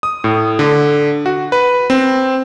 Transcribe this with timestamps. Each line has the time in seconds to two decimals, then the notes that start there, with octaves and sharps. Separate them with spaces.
0.03 D#6
0.24 A2
0.59 D3
1.26 F#4
1.52 B4
1.90 C4